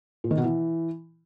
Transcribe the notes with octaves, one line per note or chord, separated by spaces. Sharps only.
A#2
D#3
B2
E3